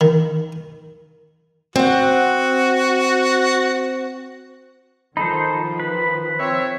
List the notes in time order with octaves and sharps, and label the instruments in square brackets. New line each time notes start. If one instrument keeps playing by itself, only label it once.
[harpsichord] D#3
[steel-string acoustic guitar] C4 F#5 [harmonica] F#4
[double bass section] D#3 F3 [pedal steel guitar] D#4 A4 C5 [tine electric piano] B5
[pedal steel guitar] B4
[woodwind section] C4 C#5 E5